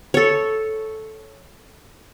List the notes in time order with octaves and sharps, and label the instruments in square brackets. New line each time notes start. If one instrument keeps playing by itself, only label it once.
[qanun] A4 C#5